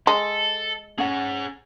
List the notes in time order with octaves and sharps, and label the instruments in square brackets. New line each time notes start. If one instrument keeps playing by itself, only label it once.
[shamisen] G#3 [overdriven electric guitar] A4
[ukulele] C#4 F#5 [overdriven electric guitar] G#4 A#5